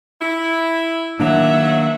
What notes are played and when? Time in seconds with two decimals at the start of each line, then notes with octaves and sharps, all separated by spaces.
0.21 E4
1.20 D#3 F#3 A#3 D4 E5 F#5